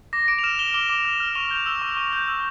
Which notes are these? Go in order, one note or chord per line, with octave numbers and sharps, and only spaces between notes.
D6 A#6
D6 D7
F7
F6 E7
F6 G7
D6 G7
D6
F6
F6
C#6 F7
G6
E6
C#6
C#6
G6
E6